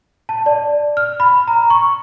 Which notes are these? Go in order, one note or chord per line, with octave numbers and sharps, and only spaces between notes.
A5
D5
F6
B5
A#5
C#6